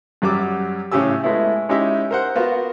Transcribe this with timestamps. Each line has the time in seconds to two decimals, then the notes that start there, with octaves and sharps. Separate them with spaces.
0.22 F#2 F#3 G3 G4 D6
0.92 A2 C#3 C#4 G4 G#4 E6
1.24 G#3 A3 B3 E4
1.69 G#3 C#4 D#4 E4 G4 E5
2.11 A#4 C5 F#5
2.35 B3 F4 F#4 A#4